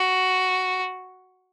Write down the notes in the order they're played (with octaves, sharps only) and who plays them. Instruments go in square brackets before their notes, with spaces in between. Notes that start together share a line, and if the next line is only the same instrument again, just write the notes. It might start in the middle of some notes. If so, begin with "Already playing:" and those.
Already playing: [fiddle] F#4